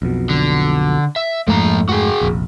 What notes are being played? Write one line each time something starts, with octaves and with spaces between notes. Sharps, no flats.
B1 F2 B2
D3
E5
F2 G#2 F3 A3 A#3 A#5
F#4 G#4
F1 A#1